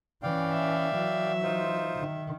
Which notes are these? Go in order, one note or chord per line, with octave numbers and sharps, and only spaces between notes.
E3 C#4 D5 F5 G5
E5
E3 F#3
D#4 F4 C5
D#3